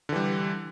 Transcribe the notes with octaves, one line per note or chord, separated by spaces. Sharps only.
D3 E3 G3